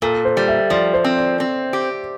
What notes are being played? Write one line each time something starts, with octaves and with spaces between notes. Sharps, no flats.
A#2 A4
C5
G3
E5
F3 D5
C5
C4
D5
C4
G4